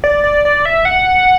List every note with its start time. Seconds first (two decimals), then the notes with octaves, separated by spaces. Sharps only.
0.04 D5
0.24 D5
0.45 D5
0.65 E5
0.85 F#5